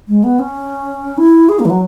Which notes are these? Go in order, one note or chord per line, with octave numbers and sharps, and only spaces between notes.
G#3
B3
C#4
E4
G#4
A#3
E3
F#3